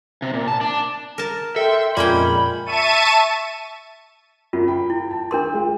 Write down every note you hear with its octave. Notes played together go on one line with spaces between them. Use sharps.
C3
A#2
A5
D4
A#4 A5
A4 E5 G5 C6
F2 A#2 G#3 A#3 C#4 G5 B5
E5 A5 C#6 D#7
F#2 F4
G5 B5
E4
G5 A5
D4 A#4 G5 C6
G#3 F4